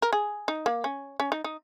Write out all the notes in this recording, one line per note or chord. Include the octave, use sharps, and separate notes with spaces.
A#4
G#4
D#4
A#3
C#4
C#4
D#4
D#4